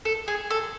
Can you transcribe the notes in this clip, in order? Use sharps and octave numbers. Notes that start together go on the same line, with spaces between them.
A4
G#4
A4